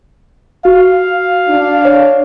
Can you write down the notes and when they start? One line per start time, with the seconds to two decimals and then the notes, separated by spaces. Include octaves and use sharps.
0.65 F#4 F5
1.48 D4
1.85 C#5